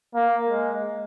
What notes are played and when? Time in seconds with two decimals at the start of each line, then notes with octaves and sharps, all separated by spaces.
0.15 A#3
0.49 G#3